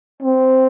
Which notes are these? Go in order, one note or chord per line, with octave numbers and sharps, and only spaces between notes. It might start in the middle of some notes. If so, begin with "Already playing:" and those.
C4